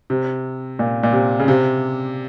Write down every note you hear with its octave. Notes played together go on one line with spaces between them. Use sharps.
C3
A#2
A#2
C3
C#3
C3